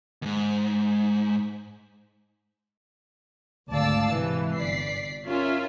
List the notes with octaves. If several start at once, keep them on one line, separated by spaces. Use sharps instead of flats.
D#2 G#2
G#1 D2 D5 F5 A5 E6
G#2 C3 E3
G1 D5 B6 C7
C#4 F4 A#4 E5